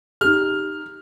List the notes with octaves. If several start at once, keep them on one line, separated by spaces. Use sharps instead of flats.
D#4 G4 F6